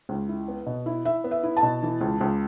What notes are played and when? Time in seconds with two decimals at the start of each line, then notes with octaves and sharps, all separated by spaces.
0.09 C#2
0.29 E4
0.48 B3
0.66 B2
0.86 E4
1.05 E4 E5
1.24 B3
1.31 E5
1.43 E4
1.57 A5
1.63 B2
1.83 E3
2.01 C#2
2.21 C#2